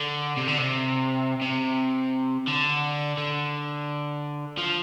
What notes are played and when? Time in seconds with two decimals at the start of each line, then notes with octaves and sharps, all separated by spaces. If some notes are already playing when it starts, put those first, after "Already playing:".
Already playing: D3
0.37 C3
0.48 D3
0.58 C3
1.42 C3
2.47 D3
3.18 D3
4.58 F3